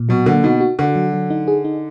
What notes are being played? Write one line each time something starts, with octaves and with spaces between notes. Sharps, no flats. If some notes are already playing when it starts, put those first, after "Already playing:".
Already playing: A#2
B2 F#3
D3 A#3
B2 D#4
F#4
D3 F#4
F#3
F#3
D#4
G#4
D#4